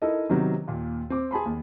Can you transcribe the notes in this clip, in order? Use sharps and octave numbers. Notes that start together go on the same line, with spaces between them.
D#4 E4 A4 A#4 D#5
C3 D#3 F#3 B3
D#2 A#2
C4 D6
G#4 A5 B5 C6
D#2